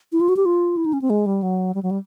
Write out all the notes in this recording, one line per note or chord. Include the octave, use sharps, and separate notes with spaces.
E4
F4
F#4
G4
F4
E4
D#4
C#4
C4
G#3
G3
F#3
G3
F#3
G3